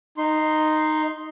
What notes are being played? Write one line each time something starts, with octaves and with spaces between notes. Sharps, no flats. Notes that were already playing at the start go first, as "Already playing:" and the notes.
D#4 C6